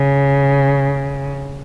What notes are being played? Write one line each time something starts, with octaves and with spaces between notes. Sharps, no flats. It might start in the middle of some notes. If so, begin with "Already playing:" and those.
Already playing: C#3